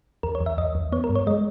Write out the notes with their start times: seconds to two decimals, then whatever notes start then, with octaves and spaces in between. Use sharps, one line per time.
0.23 E2 A#4
0.35 C#5
0.41 E2
0.46 E5
0.58 E2 D#5
0.75 E2
0.92 B3 C#5
1.04 A#4
1.10 G2
1.15 C#5
1.27 G#3 D#5